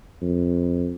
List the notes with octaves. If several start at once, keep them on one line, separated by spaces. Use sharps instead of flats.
F2